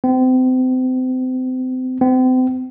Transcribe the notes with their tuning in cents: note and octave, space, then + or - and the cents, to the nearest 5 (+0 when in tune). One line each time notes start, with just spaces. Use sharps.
C4 -35
C4 -40